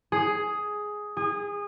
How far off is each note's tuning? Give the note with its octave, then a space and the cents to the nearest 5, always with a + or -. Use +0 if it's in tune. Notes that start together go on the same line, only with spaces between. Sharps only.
G#4 +5
G#4 -25